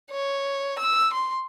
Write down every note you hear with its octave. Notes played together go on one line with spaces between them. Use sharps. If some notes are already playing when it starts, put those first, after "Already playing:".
C#5
E6
C6